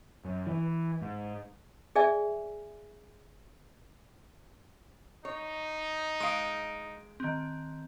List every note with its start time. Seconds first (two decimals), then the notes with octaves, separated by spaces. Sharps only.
0.25 F#2
0.47 E3
1.02 G#2
1.96 G#4 D5 E5 G#5
5.25 D#4 C#5
6.20 G#3 F5 D#6 D7
7.20 D#3 C4